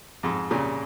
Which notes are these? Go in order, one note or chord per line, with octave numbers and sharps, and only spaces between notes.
F2 G#2
A#2 C#3